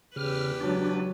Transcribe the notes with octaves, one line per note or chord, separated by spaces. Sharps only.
E2 C#3 G4 B4 F6
C#2 F#3 D4